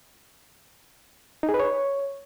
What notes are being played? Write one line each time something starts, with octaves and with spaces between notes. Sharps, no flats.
D#4
G#4
B4
C#5